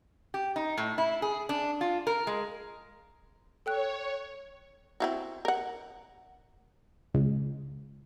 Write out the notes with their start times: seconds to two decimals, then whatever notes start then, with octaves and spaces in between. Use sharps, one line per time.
0.34 G4
0.56 D#4
0.78 A2
0.98 E4
1.22 G#4
1.49 D4
1.81 F4
2.07 A#4
2.27 G#3
3.66 A4 C#5 G5 F#6
5.00 C4 E4 F#4
5.45 A#4 F#5
7.14 C#2